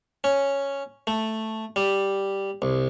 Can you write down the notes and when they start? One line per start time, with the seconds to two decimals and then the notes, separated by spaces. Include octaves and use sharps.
0.24 C#4
1.07 A3
1.76 G3
2.62 C2